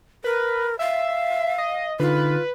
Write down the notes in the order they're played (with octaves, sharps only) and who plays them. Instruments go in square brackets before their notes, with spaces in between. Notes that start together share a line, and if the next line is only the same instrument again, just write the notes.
[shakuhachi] A#4 [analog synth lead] B4
[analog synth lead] E5 [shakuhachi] F5
[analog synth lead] D#5
[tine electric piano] D3 D#4 [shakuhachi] F4 [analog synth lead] B4